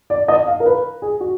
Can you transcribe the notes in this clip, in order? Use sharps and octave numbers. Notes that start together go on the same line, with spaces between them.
D5
D#5
F5
A#4
B4
G#4
F#4